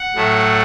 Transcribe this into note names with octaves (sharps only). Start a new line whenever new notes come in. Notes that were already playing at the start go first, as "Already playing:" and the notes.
Already playing: F#5
A2 F#3 A3